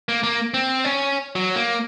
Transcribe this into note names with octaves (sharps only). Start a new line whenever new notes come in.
A#3
A#3
C4
C#4
F#3
A#3